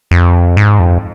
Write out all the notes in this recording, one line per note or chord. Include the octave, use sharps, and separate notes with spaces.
F2
G#2
F2